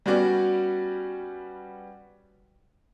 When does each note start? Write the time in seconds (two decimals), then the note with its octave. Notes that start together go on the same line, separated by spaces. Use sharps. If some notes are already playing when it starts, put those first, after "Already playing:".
0.06 G3 B3 C#4 F#4 D5